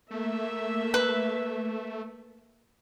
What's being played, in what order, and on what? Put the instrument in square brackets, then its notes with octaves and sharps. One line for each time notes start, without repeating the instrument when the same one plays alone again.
[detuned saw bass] A3 [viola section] A#3 E5
[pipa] B4